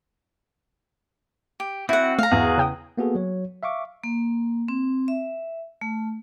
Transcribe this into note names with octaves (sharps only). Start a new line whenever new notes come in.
G4
C4 E4 F#4 F#5
A3 F5 A#5
E2 F#4 G#4 E5
C#3 G5 D#6
A#3 B3 F#4 G#4 A4
F#3 C#5
E5 F5 C#6 D6
A#3
C4
E5
A3